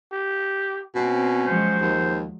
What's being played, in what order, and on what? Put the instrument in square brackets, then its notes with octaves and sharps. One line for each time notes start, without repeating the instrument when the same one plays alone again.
[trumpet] G4
[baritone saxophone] B2 [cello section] C4 [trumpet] C#4
[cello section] F3 F#3 G#3 [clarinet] C5
[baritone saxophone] D#2